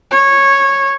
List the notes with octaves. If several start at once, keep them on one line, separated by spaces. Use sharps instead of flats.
C#5